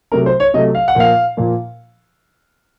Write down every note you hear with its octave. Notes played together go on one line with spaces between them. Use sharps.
C3 F#3 A3 A#4
C5
C#5
C3 F#3 A3 D#5
F5
F#5
A#2 F3 A#3 F5
A#2 F3 A#3